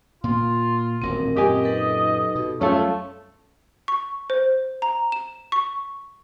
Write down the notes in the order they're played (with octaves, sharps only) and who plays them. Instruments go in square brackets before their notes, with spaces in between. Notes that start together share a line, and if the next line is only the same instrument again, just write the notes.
[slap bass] A#2 A#3 [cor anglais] F4
[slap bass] D#1 A1 B2 [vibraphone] C4 A#4
[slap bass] F#2 A#2 [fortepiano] G4 G#5 [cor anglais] D#5
[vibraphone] D#4 A4 B4
[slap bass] B2
[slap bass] F#2 G3 [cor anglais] A3 [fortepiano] C#4 F4 A4
[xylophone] C#6
C5
A#5
E7
C#6